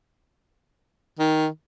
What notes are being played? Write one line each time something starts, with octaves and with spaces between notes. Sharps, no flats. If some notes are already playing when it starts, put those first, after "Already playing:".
D#3